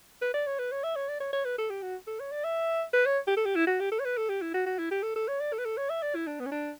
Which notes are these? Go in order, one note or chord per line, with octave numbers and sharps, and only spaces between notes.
B4
D5
C#5
B4
C#5
E5
C#5
D5
C#5
C#5
B4
A4
G4
F#4
A4
C#5
D5
E5
B4
C#5
G4
A4
G4
E4
F#4
G4
A4
C#5
B4
A4
G4
E4
F#4
F#4
E4
G4
A4
A4
C#5
D5
A4
B4
A4
C#5
E5
D5
E4
D4
B3
C#4
D4